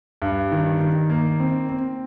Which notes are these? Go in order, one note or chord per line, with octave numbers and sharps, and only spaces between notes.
G2
D#3
D#3
A#3
C4
C4